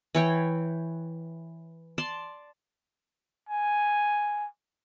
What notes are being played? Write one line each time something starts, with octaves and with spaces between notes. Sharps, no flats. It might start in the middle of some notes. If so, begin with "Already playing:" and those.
E3 C#5 G5
D5 A5 C6
G#5